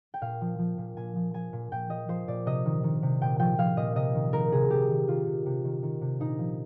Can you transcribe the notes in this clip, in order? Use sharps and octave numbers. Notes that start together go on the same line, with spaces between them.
G5
A#2 F5
F3
F3
A#2
A#2 G#5
F3
F3 G#5
A#2
A#2 G5
F3 D#5
F3 C5
A#2 D5
C3 D#5
D#3
D#3
C3
A#2 G5
F3 G5
F3 F5
A#2 D#5
C3 D#5
D#3
D#3 A#4
C3 G#4
C3 G4
D#3
D#3 F4
C3
C3
D#3
D#3
C3
A#2 D#4
F3